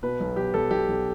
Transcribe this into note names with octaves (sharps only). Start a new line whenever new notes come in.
B2 B4
B1
B1 G4
B1 A4
B1 G4
B1